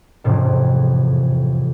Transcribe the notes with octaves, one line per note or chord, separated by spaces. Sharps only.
E1 A1 F2 G#2 C3